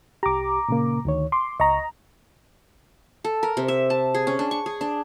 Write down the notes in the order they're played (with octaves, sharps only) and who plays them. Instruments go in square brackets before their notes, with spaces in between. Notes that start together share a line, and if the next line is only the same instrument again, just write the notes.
[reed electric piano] C2 G4 [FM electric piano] A#5 D6
[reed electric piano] A#2 C#3 A#3
D2 D#3 C#5
[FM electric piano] C6 [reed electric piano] D6
[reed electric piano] C#2 C#6 [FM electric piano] D#5 A#5
[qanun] A4
A#4
C3
E5
A5
G#4
C#4
D4
C#6
G#4
D4